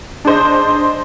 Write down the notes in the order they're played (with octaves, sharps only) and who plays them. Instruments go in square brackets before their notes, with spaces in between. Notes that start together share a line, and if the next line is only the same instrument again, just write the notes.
[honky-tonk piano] D4 G#4 C5 D#5